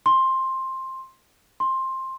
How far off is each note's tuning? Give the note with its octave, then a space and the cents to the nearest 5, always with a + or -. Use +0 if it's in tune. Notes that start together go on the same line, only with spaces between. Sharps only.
C6 +10
C6 +15